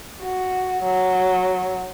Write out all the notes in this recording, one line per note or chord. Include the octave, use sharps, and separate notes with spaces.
F#4
F#3